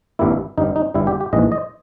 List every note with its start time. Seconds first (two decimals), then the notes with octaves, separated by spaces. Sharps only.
0.19 G#1 G2 G3 A#3 E4
0.58 G1 G2 G3 D#4
0.76 D#4
0.94 G1 G2 G3 E4
1.07 G4
1.21 G4
1.33 A#1 G#2 E3 D#5
1.52 D#5